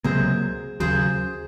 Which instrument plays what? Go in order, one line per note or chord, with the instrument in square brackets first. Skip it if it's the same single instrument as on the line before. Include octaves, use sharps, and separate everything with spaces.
[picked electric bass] C#2 C3 F#3 A#3 [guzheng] G#4 C5
[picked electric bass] D#2 C#3 F#3 [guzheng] G#4 C5